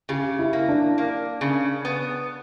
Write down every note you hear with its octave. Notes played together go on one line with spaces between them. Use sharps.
C#3 G4
E4
A#3
D4
A#3
C#3
B3